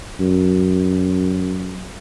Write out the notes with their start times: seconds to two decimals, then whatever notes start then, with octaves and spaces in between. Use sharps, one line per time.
0.20 F#2